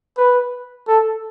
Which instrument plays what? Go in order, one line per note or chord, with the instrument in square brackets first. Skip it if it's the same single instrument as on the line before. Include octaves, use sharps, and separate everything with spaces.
[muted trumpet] B4
A4